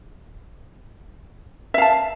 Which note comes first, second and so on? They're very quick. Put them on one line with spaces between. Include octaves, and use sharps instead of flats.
E5 F5 A5